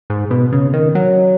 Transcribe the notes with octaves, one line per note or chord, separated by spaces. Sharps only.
G#2
B2
C#3
D#3
F#3